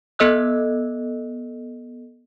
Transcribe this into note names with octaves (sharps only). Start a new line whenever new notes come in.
B3 A4 D#5 E6 F#6